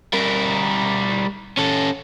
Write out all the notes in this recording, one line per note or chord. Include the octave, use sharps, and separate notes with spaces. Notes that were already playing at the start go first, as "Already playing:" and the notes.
G3 A#4
C#4 A4